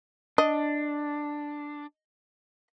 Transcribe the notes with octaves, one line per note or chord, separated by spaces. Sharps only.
D4 D#5